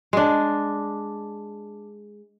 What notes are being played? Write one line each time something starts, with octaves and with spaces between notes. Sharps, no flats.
G#3 D4